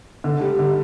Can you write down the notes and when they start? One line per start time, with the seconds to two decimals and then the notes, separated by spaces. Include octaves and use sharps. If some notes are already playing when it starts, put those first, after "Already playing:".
0.24 D3
0.41 G3
0.59 D3